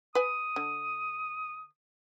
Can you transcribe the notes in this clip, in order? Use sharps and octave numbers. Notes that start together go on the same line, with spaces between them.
B4 G#5 D#6
D3